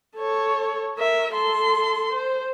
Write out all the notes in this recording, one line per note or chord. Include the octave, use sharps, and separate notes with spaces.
A4 C#5
A#4 E5
A4 C6
C5